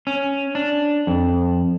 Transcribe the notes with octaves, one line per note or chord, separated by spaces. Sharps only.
C#4
D4
F2